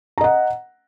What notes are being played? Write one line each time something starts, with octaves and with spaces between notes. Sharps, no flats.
D#5 F#5 A#5